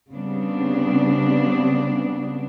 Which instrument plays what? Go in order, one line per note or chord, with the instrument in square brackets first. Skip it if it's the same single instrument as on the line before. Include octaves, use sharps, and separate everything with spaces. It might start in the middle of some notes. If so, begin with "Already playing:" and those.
[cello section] C#3 G3 B3 C4 D4